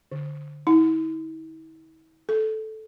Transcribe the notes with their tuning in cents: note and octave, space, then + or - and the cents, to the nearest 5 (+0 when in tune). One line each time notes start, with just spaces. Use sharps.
D3 +0
E4 -45
A4 -10